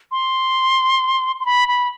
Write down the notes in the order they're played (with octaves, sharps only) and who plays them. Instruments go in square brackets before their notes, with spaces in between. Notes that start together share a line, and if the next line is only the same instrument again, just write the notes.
[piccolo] C6
C6
B5
B5